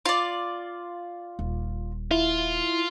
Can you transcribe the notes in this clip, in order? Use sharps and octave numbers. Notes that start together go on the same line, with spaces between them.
F4 D5
D#1
E4 F4